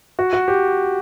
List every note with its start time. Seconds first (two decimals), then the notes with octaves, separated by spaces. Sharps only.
0.19 F#4
0.33 F#4
0.48 G4